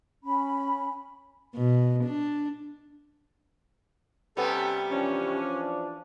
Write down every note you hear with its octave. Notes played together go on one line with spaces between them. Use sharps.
C#4 B5
B2
D4
C3 G3 B3 C#4 G4 A4
E3 F3 C#4 D4